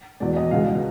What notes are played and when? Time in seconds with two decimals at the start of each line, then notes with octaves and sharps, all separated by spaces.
0.20 E2 B2 G#3 D5
0.37 D#5
0.51 C#2 B2 G#3 F5